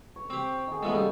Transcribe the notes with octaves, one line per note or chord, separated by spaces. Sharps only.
C#5
C4 G4
D#3 G#4
C#3 F3 G#3 A3 B3 A4
G3 G4